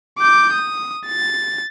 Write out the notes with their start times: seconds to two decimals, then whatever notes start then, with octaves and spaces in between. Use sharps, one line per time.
0.19 D6 G6
0.53 D#6
1.07 A6